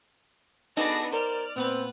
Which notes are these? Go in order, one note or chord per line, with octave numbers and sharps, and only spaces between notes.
B3 D4 D#4 F#4 G#4 A4 A#6
A#4 C5 D5 F6
A#2 B3 C4 B4